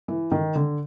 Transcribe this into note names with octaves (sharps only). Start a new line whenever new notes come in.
E3
D#3
D3